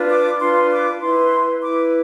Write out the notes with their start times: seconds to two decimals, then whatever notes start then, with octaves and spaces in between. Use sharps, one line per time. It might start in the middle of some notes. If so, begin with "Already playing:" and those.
Already playing: D4 F4 B4
0.10 D6
0.40 D4 F4 B4 C6
0.70 D6
1.01 E4 B4 C6
1.61 E4 B4 D6